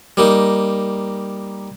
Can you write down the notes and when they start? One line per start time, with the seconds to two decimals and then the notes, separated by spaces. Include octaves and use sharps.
0.17 G3 A#3 D#4